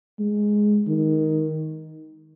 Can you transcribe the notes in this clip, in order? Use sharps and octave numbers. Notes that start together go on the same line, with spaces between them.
G#3
D#3